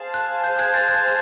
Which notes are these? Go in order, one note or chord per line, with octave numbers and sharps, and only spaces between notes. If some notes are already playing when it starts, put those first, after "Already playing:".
Already playing: G#4 C5 F5 A5
F#6
G6
F#6 G#6
G6 A6
F#6 G#6